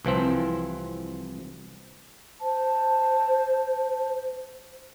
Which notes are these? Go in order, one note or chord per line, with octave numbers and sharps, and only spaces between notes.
C2 E3 F3 C4
C5 A5